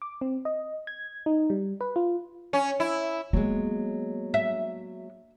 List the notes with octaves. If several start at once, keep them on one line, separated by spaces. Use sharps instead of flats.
D6
C4
D#5
G#6
D#4
G3
B4
F4
C#4
E4
F#3 G#3 A#3 B3
E5